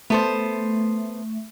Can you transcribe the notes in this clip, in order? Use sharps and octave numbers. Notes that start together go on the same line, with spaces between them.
A3 B3 A4 C5